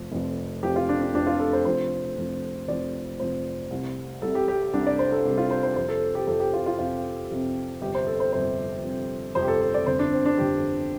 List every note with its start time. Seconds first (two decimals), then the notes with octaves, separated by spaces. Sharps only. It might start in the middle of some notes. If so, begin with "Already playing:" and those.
Already playing: F1 F2 F3
0.12 F1 F2 F3
0.63 F1 F2 F3 G4
0.76 F4
0.89 D4
1.02 D4
1.14 F1 F2 F3 D4
1.27 F4
1.40 A4
1.53 C5
1.65 F1 F2 F3 C5
2.17 F1 F2 F3
2.68 F1 F2 F3 D5
3.20 F1 F2 F3 C5
3.71 C2 C3 G3
4.22 C2 C3 G3 A4
4.35 G4
4.48 G4
4.73 C2 C3 G3 D4
4.86 D5
4.99 C5
5.12 A4
5.25 C2 C3 G3
5.38 F4
5.51 C5
5.63 C5
5.76 F2 C3 F3 C5
5.89 A4
6.15 G4
6.27 F2 C3 F3 A4
6.40 G4
6.53 F4
6.66 F4
6.79 F2 C3 F3 F4
7.30 F2 C3 F3
7.81 G1 F2 C3 G4
7.95 C5
8.07 A4
8.20 C5
8.32 G1 F2 C3 C5
8.84 G1 F2 C3
9.35 G1 F2 C3 C5
9.42 G4
9.48 A4
9.61 A4
9.74 D5
9.86 G1 F2 D3 C5
9.99 D4
10.13 C4
10.25 D4
10.38 G1 F2 D3 G4